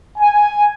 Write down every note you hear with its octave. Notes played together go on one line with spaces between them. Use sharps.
G#5